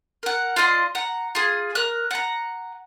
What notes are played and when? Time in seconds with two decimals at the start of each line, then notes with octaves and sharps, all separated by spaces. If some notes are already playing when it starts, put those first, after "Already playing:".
0.23 A#4 F#5
0.56 F4 D5 D#5 C6
0.95 F#5 A#5
1.35 F4 G#4
1.75 A#4 F#6
2.11 F#5 A#5